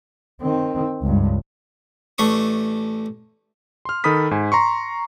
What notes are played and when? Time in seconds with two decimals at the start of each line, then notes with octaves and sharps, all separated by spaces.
0.41 D#3 C4
1.02 C#2 G2
2.18 A1 A3 D4 C#6 D#6
3.85 C6 F6
4.04 D#3 A4 B5 D#6 B6
4.31 G#2 G#5
4.52 A#5 C6 C#6